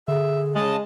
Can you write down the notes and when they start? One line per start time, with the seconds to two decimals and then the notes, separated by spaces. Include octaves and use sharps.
0.08 D3 G#4 E5
0.55 C#3 G#3 D#5 A5